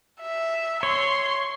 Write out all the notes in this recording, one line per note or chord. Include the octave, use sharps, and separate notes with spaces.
E5
C#5 C6